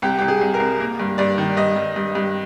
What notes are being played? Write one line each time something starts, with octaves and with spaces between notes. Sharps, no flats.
C2 G4
C2 G4
G#4
C2
A#4
C2
A#3
G2
G2 D5
D#3
G2 D#5
G2
G2
G2